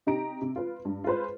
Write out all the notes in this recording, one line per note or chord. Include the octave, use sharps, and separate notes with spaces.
C3 D#4 G4 A#5 D7
C3
F4 B4
G2
F4 G#4 B4 C5